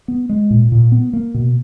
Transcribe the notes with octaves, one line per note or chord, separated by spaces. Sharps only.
B3
G#3
A#2
A#2
B3
A#3
B2